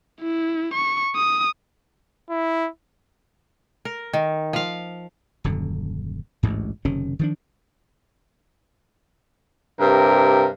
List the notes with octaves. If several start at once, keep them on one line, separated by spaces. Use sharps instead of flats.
E4
C#6
D#6
E4
A#4
D#3
F3 F5
D#1 F#2 D3
A1 D2 G#2
F#1 C3 D#3 C#4
D#3 F3 D4
G2 C3 A#4